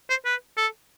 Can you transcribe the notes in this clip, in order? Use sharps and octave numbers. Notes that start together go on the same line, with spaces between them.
C5
B4
A4